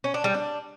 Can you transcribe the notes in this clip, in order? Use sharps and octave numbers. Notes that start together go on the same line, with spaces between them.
C#4
D4
G3
D4